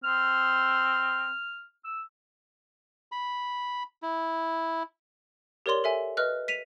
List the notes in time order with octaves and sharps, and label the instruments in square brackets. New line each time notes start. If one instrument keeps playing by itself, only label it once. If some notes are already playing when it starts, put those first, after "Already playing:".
[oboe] C4 [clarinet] F6
[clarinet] E6
[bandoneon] B5
E4
[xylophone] G4 A#4 C#5 D5 C6 G7
A4 E5 G#5
B4 D#5 F6 F#6
B6 D#7 F7